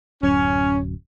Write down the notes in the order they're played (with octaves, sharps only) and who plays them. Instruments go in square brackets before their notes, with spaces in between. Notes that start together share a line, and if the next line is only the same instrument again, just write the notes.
[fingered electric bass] D1 F#2 [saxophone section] C#4